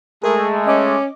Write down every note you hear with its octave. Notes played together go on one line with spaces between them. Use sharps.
G#3 A3 G#4 A#4
C#4 D#5 D6